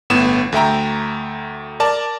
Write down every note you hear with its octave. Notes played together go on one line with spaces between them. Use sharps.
G1 A2 B3 E7
D2 A3 E5 G5 A#5
A#4 D5 A5